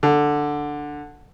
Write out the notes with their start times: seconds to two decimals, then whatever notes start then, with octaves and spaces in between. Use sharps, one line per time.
0.03 D3